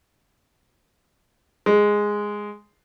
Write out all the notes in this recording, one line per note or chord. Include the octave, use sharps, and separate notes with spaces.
G#3